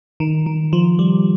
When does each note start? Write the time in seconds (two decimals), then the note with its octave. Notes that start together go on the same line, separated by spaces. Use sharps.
0.20 D#3
0.46 D#3
0.73 F3
0.99 G3